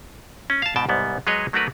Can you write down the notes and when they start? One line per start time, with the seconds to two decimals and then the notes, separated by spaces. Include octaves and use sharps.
0.50 C#4
0.62 F5 A5
0.76 G#2 B2 G5 A5
0.89 C2 G#2 G3 B3
1.27 F#3 G#3 G#4 B4 C#5 D#5
1.53 F#3 A3 D4 F#4 A#4 B4